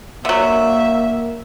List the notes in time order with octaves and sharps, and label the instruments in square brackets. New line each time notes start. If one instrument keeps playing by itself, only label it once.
[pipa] D3 F#3 [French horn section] A#3 [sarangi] E5